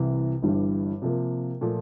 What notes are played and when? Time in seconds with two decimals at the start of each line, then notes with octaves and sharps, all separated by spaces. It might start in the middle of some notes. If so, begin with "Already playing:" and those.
Already playing: C2 C3 E3
0.43 G1 G2 E3 G3
1.02 C3 F3 A#3
1.61 A#2 F3 A3